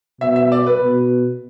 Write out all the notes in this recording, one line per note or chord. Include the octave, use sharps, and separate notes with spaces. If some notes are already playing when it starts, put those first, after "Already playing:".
B2 E5
E5
D5
B4
B2